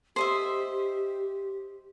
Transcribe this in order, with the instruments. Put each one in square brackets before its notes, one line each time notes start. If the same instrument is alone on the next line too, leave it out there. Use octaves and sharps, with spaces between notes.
[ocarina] G4 [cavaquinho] C5 D#5 E5